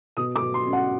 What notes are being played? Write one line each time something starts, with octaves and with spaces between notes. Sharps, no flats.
B2 D#6
D6
B2
C6
C#4
F#5